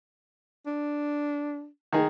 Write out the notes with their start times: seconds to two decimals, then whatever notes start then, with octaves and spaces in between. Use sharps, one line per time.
0.66 D4
1.93 D#3 D#4 G#4